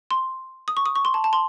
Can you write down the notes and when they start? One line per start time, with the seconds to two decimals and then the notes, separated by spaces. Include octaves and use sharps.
0.11 C6
0.68 D#6
0.77 C#6
0.86 D#6
0.95 C#6
1.05 C6
1.14 A5
1.24 A5
1.33 C6